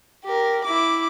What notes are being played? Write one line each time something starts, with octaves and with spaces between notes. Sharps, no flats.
G4 A#4
E4 D6